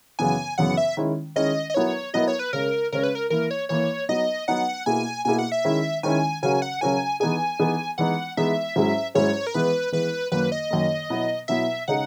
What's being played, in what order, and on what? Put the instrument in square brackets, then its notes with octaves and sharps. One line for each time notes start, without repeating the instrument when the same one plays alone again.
[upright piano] F#2 C#3 E3 B3 [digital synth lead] G#5
[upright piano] F#2 C#3 E3 B3 [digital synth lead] F#5
[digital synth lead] E5
[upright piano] D#3 G#3 C#4 E4
[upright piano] D#3 G#3 C#4 E4 [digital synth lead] D#5
[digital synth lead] D#5
[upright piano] F#3 B3 E4 A#4 [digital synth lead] C#5
[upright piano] F#3 B3 E4 A#4 [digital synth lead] D#5
[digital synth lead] C#5
B4
[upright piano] C#3 G#3 C#4 [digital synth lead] A#4
[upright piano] C#3 G#3 C#4 [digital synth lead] A#4
[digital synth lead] B4
A#4
[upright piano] E3 A#3 E4 [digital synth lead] A#4
[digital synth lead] C#5
[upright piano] E3 A#3 E4 [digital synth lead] C#5
[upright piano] F#3 B3 D#4 [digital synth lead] D#5
[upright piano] F#3 B3 D#4 [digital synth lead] F#5
[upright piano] B2 A#3 E4 G#4 [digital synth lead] G#5
[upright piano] B2 A#3 E4 G#4 [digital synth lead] G#5
[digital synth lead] F#5
E5
[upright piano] D#3 G#3 C#4 E4
[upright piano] D#3 G#3 C#4 E4 [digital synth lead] G#5
[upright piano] C#3 F#3 C#4 F#4 A#4 [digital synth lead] G#5
[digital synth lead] F#5
[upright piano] C#3 F#3 C#4 F#4 A#4 [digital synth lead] G#5
[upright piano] E3 B3 D#4 G#4 [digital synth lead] G#5
[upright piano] E3 B3 D#4 G#4
[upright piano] E3 G#3 B3 D#4 [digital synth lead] F#5
[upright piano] E3 G#3 B3 D#4 [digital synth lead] E5
[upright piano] G#2 F#3 C#4 E4 G#4
[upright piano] G#2 F#3 C#4 E4 G#4 [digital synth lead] C#5
[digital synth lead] A#4
[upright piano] E3 G#3 B3 E4 [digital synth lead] B4
[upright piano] E3 G#3 B3 E4 [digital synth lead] B4
[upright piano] F#2 D#3 A#3 [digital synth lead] B4
[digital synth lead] D#5
[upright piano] F#2 D#3 A#3
B2 F#3 B3 E4
[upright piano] B2 F#3 B3 E4 [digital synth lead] E5
[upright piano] C#3 G#3 D#4 G#4 [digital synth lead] F#5